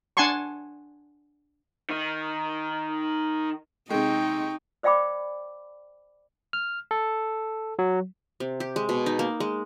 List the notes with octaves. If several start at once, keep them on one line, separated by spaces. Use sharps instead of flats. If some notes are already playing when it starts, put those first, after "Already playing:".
D4 F#5 G#5 A5 C6 C#6
D#3 D#4
C3 G#3 D#4 G5 C#6
C5 D5 F5 G5 B5 D6
F6
A4
F#3
C3
G4
G#3
B2
D#4
A#3
G#3